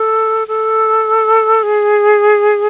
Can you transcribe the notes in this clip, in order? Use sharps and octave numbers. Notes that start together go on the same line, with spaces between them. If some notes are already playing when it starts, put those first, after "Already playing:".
Already playing: A4
A4
G#4